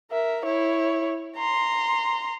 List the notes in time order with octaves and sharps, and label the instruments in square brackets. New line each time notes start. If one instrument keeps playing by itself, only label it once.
[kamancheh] A#4 E5
E4 C#5
A#5 C6